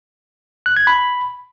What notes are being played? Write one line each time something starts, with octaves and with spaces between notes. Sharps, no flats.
F#6
G#6
B5